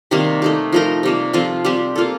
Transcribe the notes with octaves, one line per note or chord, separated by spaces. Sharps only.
C3 D#3 G3 A#3
A3 D#4 G4
F3 A3 D#4 A#4
C3 G3 A#3
F3 C4 F4 A4
G3 C4 G4
A#3 F4 A4